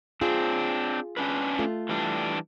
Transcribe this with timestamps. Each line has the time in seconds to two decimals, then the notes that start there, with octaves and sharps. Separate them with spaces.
0.21 C4 D4 F4 G#4
1.17 C#4 D4 B4
1.59 A3 F4
1.89 E3 G3 D4